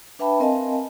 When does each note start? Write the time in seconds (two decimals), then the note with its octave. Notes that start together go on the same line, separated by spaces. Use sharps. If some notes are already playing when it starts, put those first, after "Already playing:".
0.19 D4 B4 E5 G5 A5 B5
0.40 C4 A#4 D#5 F5 G#5 A5